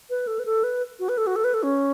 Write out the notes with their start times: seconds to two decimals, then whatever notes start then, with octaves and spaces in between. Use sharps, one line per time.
0.10 B4
0.27 A4
0.39 B4
0.46 A4
0.64 B4
0.99 F#4
1.09 B4
1.18 A4
1.27 F#4
1.36 A4
1.44 B4
1.54 A4
1.63 C#4